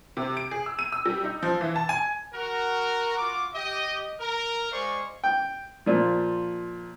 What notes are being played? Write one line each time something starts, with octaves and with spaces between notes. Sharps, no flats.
C3
D7
G#4
E6
D#7
E6
G3
D#4
F3
E3
A5
G#5
F#4 A#4
F4 F#4 D6
G4 D#5
A#4
G#3 C5 D5 F5 C#6
G5
A#2 F3